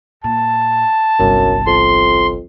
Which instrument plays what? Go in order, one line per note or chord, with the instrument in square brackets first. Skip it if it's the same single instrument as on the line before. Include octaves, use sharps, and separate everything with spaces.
[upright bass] A#2 [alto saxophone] A5
[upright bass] G1 C2 [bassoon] F#2
[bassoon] F2 [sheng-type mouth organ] C6